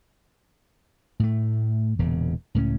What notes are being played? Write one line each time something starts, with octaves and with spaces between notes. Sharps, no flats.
A2 A3
E1 E2 A#2 C#3
C#2 A2 F#3 C#4